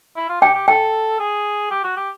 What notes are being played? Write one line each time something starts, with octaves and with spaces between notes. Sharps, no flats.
E4
F4
G4 G5
G4
A4 G5
G#4
G4
F#4
G4